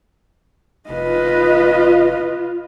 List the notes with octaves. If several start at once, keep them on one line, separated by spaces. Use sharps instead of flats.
F1 F4 B4 D#5